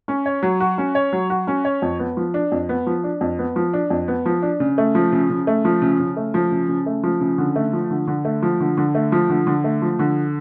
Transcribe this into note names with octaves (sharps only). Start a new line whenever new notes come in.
C#4
C#5
F#3
F#4
C#4
C#5
F#3
F#4
C#4
C#5
F2
B3
F3
D4
F2
B3
F3
D4
F2
B3
F3
D4
F2
B3
F3
D4
C#3
A3
F3
C#3
C#3
A3
F3
C#3
C#3
A3
F3
C#3
C#3
A3
F3
C#3
D3
A3
F3
D3
D3
A3
F3
D3
D3
A3
F3
D3
D3
A3
F3
D3